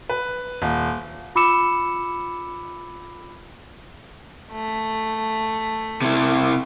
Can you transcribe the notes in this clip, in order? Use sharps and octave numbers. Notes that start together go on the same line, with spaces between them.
B4
D#1
F4 B5 D6 E6 C#7 E7
A3
C3 E4